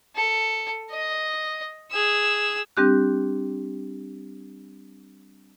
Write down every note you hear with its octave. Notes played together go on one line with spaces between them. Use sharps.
A4
D#5
G#4 E6
G3 C4 D4 G4 D6 F#6